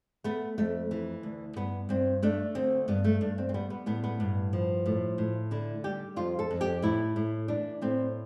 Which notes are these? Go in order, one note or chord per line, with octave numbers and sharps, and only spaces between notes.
A3 B3
F2 A3
E3
D2
G2 B3
G2 C4
A3 D4
D2 C4
G2 B3
A3
G2 D4
C4
C4
G3 B3
B3
A2 B3
B3
G2
F3
A2
A2
D3 E4
G3 G4
F2 F4
A4
F2
G4
A2 E4
A2
E3 D4
A2 C4